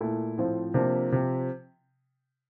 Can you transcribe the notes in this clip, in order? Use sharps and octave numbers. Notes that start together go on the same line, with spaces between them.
A#2 A3 E4
A2 F3 C4 F4
C3 F3 A#3 D4
C3 F3